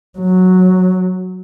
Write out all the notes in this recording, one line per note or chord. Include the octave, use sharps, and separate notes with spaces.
F#3